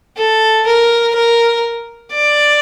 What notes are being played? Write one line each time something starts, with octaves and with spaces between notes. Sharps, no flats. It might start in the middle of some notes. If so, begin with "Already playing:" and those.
A4
A#4
A#4
D5